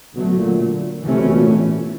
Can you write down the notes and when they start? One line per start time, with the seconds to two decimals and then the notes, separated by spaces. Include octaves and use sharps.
0.15 B2 D3 F#3 A3
0.37 A#2
1.02 C3 E3 A3 C#4
1.20 B2
1.33 A#2
1.45 A2